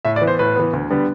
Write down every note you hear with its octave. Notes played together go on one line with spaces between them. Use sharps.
A2 E5
D5
E3 B3
C5
A2 B4
E3 B3
D2
D3 G3 B3